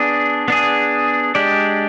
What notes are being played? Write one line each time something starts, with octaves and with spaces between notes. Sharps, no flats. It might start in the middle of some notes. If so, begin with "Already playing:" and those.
Already playing: B3 D4 G#4
B3 D4 G#4
G#3 D4 G4 D5